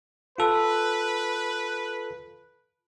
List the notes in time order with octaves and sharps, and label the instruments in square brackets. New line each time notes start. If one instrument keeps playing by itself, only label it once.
[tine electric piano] F4 A4 [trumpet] B4